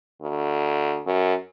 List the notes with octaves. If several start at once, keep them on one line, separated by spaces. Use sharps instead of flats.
D2
F#2